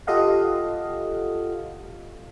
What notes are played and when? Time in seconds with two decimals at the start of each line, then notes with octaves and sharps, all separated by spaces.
0.07 F4 G4 A4 D#5 F5 F#5